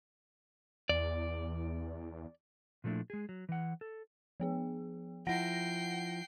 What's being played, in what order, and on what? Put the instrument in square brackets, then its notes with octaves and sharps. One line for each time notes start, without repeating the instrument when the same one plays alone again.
[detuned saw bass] E2 [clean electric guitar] D5
[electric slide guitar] A#2 F3 A3 D4 E4
G#3 G#4
F#3
E3 F#5
A4
[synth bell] F3 B3 G#4
[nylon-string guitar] F3 E4 [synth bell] F#5 A#6 [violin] G5 C7